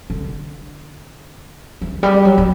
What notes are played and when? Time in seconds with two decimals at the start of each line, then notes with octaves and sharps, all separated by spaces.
0.10 D3
1.81 E3
2.03 G3
2.25 F#3
2.38 F#3